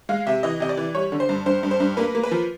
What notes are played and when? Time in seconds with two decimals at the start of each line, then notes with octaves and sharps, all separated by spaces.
0.09 G#3 F5
0.27 C3 E5
0.43 E3 D#5
0.60 C3 D#5
0.69 D5
0.77 E3
0.95 G3 C#5
1.12 D3
1.20 C5
1.29 G2
1.46 G2 C5
1.63 G2
1.71 C5
1.80 G2
1.97 A#3 B4
2.15 A#3
2.23 B4
2.31 F3